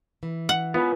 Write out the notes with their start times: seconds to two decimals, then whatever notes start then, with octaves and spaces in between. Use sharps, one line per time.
0.23 E3
0.49 F#5
0.74 B3 F4 B4